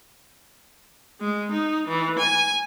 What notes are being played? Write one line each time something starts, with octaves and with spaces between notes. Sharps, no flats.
G#3
D#4
E3
G#5